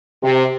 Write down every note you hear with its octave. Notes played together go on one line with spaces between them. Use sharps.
C3